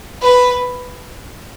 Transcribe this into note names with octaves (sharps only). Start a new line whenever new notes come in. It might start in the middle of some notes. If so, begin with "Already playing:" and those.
B4